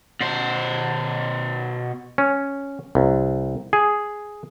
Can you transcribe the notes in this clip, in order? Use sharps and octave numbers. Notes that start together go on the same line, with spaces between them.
B2 C5
C#4
C2
G#4